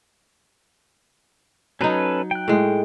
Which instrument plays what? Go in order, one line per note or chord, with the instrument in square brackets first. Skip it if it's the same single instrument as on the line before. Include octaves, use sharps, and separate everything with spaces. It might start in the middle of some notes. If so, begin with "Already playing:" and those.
[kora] F#3 D#4 [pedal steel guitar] C#4 A4 B4
[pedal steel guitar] G5 F#6
[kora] A2 G#3